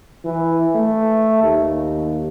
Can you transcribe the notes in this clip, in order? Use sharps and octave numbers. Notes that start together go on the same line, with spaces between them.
E3
A3
D#2